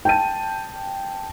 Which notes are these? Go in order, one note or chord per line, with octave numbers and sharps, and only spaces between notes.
G5 A5 D#7